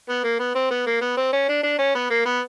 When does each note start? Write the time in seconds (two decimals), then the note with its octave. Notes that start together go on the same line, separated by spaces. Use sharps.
0.09 B3
0.24 A#3
0.39 B3
0.55 C4
0.70 B3
0.86 A#3
1.01 B3
1.17 C4
1.33 C#4
1.48 D4
1.63 D4
1.78 C#4
1.95 B3
2.10 A#3
2.25 B3